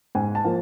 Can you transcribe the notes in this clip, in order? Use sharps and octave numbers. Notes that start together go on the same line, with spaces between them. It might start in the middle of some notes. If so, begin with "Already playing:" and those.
G#2 G#5
A5
F3 A#3